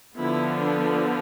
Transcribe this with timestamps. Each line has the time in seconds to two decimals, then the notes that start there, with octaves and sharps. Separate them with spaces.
0.16 D3 F3 B3 E4
0.55 D4